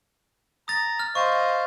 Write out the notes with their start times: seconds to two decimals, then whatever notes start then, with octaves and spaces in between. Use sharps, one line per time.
0.68 A#5 D#6 A6
0.99 F6
1.15 C5 D#5 F5 C#6